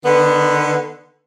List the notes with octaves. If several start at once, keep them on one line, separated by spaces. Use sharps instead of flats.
D3 D#3 B3